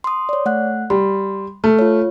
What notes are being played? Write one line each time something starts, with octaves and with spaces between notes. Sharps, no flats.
C6 D#6
C#5 D5
A3 F#5 F#6
G3 C6
A3 F6
F4 C#5